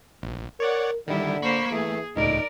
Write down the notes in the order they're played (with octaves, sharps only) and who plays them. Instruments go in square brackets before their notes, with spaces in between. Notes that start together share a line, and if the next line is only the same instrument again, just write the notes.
[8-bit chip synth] A#1
[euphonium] A#4 [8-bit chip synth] C#5 D5 F#5
[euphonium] D3 [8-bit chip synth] D#3 G3 [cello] E4
[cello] A#3 C5 [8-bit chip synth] B5 C#6 B6
[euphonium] E3 [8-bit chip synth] A3 [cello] G#4
[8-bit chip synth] C#2 A2 [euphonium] D#4 [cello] A#4 D5